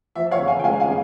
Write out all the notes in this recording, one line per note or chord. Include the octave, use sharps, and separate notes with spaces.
F3 E5
C#5 F5
C#3
F5 G#5
G5
G#3 F5 G#5
F5 G#5
C#3